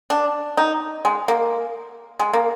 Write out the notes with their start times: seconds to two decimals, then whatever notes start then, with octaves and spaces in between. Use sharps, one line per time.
0.10 D4
0.57 D#4
1.05 G#3
1.28 A#3
2.19 G#3
2.33 A#3